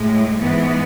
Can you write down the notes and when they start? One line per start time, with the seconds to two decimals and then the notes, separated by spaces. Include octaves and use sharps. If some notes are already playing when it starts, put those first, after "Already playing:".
Already playing: A2 G#3
0.37 G#2 E3 G#3 B3